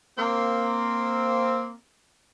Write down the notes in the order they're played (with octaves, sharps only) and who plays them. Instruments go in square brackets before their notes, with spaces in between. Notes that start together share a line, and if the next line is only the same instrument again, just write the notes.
[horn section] A#3 C4